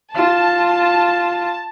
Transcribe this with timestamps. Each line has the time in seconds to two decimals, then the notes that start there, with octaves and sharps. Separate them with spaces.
0.15 F4 A5